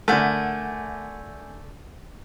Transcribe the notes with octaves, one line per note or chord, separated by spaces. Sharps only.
D3 A3 A#4 E5 F#5 G#5 G6 G#6